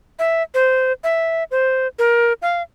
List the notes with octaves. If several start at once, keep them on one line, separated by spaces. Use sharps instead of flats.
E5
C5
E5
C5
A#4
F5